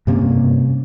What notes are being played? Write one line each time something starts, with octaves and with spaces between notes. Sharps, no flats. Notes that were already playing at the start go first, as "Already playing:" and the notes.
G2 C3 A#3 C#4